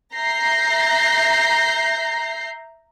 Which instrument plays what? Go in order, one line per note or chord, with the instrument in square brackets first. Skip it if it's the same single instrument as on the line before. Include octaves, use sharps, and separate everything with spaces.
[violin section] E5 A#5 G6 A#6 C7